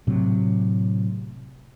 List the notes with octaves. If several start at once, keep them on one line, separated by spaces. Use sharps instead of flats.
A2 C3 F#3